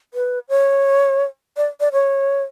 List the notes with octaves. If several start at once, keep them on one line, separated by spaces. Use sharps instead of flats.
B4
C#5
D5
D5
C#5